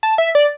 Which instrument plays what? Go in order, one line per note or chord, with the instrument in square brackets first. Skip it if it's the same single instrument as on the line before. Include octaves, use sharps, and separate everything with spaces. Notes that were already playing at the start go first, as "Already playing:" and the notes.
[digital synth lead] A5
E5
D5